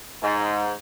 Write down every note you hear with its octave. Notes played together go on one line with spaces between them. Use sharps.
G#2